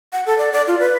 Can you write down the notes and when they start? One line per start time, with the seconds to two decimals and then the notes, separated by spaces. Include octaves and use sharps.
0.13 F#5
0.26 A4
0.38 D5
0.52 D5
0.67 F4
0.80 B4